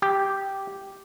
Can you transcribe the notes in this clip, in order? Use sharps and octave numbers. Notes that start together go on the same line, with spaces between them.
G4